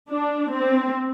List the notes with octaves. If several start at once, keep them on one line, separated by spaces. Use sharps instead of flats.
D4
C4